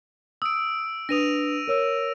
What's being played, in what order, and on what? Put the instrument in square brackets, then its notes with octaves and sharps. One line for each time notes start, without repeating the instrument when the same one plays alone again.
[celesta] D#6 [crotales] E6 D7
[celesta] D4 B4 D#6 [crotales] A#6 D#7 F7
[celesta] A#4 C#5 E6